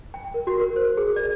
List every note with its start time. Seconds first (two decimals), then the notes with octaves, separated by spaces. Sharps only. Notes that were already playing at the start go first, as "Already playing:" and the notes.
0.14 G5
0.34 A#4
0.47 F#4
0.60 A#4
0.76 C5
0.97 G#4
1.16 D5